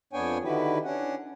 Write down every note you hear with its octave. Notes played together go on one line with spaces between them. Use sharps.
F2 B3 D4 C#5 G5 G#5
D3 D#3 E4 F#4 G4 B4
C#4 D4 F#5